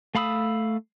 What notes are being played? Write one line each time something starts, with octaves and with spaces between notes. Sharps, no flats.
A3 F5 B5 D#6 E6